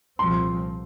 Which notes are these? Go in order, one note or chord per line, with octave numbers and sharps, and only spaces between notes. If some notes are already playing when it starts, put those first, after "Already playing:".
C2 A#2 F3 C4 C6